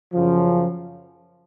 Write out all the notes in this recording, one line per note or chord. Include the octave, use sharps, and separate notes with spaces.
F#2 C#3 F3